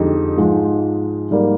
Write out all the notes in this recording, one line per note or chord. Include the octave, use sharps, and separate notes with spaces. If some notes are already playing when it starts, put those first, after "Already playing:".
Already playing: F2 D3 G#3 D#4 G4
G#2 F3 G#3
G#2 G3 A#3